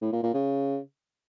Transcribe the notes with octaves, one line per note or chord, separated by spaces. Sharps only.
A2
A#2
A#2
C#3